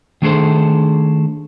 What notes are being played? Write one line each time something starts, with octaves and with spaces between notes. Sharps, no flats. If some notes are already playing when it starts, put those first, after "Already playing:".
D#3 A3 D4 G#4 A4 C5